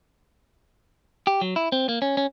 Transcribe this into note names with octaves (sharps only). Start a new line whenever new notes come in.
G4
F#3
E4
C4
A#3
C#4
C#4